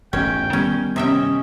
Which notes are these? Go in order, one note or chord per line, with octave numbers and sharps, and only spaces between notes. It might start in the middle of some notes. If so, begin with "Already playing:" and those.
E1 A1 G#2 C#4 G5
D#3 G3 B3 C#4
C3 C#4 D#5 E5 G5